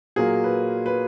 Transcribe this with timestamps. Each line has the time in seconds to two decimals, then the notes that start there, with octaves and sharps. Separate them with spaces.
0.16 A#2 F#3 A#3 G#4
0.44 B4
0.86 B4